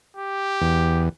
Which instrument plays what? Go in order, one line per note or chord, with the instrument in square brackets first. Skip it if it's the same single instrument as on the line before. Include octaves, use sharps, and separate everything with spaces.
[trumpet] G4
[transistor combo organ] E2